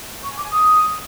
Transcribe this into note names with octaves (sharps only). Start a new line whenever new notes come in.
C#6
G#5
D6
G#5
D#6